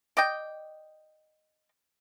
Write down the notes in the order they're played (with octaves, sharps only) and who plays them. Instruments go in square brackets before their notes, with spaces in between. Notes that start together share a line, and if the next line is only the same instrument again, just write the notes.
[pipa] D5 D#5 G5